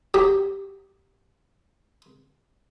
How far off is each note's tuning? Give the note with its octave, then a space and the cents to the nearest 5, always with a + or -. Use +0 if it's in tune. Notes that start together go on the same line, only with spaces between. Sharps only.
F#3 +0 G4 +0